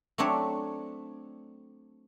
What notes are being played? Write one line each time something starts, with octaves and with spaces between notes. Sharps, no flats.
F#3 A3 C4 D4 C#5